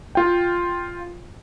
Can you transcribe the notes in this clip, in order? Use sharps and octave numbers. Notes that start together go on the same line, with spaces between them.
F4 G5